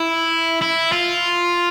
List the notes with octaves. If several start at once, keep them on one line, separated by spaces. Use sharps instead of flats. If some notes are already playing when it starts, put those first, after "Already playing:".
Already playing: E4
E4
F4